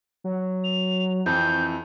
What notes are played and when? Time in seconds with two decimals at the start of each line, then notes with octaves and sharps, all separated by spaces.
0.24 F#3
0.64 F7
1.26 F2 E3 C4 G6